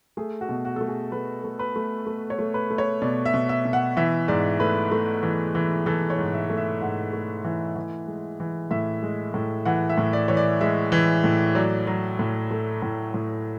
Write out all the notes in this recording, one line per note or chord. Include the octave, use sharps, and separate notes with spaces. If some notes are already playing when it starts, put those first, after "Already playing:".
A3 G#4
F#4
B2
F#4
A3 A4
G#4
A3 B4
A3
B4
A3
A3
C#5
A3
B4
A3
C#5
B2 D5
E5
B2
E5
B2
F#5
E3 E5
G#2 D5
A3 B4
A3
E3
E3
E3 A4
C#5
G#2
E5
A3
E5
G#2 F#5
A3
E3
E3
G#3
E3
A2 E5
G#3
A2
E3 F#5
E5
A2
D5
E3 C#5
D5
G#3 E5
E3
A2
F#3 D5
F#3
A2
A3
A2
A2